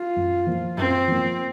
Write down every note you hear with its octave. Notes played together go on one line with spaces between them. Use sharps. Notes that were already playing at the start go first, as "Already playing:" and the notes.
Already playing: F4
F#2
F3 A#3
F#2 C4
F3 A#3